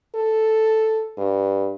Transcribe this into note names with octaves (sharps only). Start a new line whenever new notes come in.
A4
G2